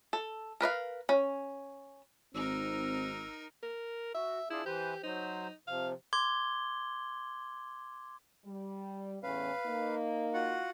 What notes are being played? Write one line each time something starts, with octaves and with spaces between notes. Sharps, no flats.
A4
A#4 B4 D#5 F5
C#4
G#1 C4 D#4 A#4 E6
A#4
F#4 E5
D4 E4 F4 G#4
E3 G4 B4 C5
F#3 D#4 C5
C3 F3 F5
C6 D6 G#6 G7
G3
E2 A2 C#4 B4 F5
A#3 D#4
F4 F#4 F#5